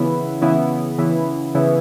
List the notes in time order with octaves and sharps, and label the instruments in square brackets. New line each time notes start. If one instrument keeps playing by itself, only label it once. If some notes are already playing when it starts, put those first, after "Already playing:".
Already playing: [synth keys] C#3 E3 B3 E4
C#3 E3 B3 E4
C#3 E3 B3 E4
C#3 E3 B3 E4